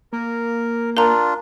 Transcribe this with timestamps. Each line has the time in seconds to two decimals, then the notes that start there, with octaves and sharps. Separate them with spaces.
0.13 A#3 A#4
0.97 D4 F4 A#4 F5 A#5